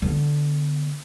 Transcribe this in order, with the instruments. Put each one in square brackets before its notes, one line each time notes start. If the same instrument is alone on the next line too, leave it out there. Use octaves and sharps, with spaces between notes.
[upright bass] D3 B3